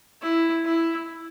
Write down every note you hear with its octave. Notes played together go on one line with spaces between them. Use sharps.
E4
E4